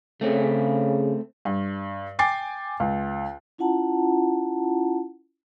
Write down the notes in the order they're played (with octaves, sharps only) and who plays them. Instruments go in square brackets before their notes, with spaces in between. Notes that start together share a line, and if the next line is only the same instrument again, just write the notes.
[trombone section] C#3 [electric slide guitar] A3 C4
[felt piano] G2
G5 G#5 D6 A6 C7
C#2
[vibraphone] C#4 E4 F4 F#5 A5 A#5